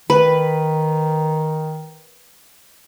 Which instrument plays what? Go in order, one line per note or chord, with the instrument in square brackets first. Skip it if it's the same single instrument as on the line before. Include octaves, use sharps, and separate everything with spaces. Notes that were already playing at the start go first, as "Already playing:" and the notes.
[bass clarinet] D#3 [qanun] B4